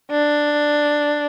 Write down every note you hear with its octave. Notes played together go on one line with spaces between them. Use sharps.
D4